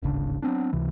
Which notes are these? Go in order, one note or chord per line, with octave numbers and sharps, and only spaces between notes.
D1 G#1 C#3 D4
F#3 B3 C4 D4
C#2 C3 E3